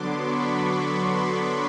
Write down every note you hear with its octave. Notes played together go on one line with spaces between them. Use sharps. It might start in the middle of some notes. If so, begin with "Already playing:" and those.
Already playing: D3 F#3 B3 D4 C6 D6
B5 C#6
C6 D6